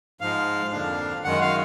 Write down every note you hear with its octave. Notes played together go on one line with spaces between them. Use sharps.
G#2 F3 G#3 F5
F2 D3 F3 A#3 D4 F5
F#2 D#3 G#3 F#5
F5